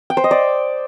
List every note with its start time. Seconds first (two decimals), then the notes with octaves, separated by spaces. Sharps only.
0.10 G5
0.17 C5
0.24 D#5
0.31 D5